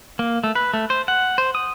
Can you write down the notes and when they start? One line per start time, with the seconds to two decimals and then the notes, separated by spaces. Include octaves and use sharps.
0.19 A#3
0.44 A3
0.55 B4
0.74 A3
0.90 C5
1.08 F#5
1.38 C5
1.55 D#6